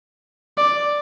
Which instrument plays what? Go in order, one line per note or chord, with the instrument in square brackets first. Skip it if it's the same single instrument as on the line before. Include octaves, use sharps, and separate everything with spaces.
[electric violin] D5